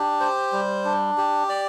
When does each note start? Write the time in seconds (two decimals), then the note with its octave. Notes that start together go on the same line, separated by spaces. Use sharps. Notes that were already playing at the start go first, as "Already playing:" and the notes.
Already playing: D4 G4
0.20 C5
0.52 G3
0.85 D4
1.18 G4
1.49 D5